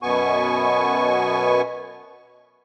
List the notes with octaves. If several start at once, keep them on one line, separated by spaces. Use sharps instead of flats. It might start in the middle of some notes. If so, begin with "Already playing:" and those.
F#2 B2 B3 G#5 C#6